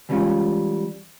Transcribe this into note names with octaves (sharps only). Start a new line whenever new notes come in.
E3 G3 G#3 C#4 F4